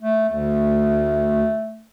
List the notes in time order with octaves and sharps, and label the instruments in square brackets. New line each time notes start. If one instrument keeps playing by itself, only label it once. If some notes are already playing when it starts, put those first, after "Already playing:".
[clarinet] A3
[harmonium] D2 [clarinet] A3